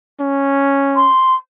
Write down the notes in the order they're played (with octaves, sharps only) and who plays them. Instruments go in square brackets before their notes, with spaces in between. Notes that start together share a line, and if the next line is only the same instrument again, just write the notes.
[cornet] C#4
[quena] C6